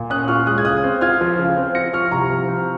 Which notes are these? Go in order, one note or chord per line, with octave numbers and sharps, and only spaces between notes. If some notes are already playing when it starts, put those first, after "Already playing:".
Already playing: A#2
C#4 D#6 F#6
F4 C#6 F6
G#3 D#6 F#6
G#6
C#3 D#6 F#6
C4
F4 F6 G#6
F3
C#3
C4
F4 A#6 C#7
F3 C#6 F6
C2 A#5 C#6
F3
C4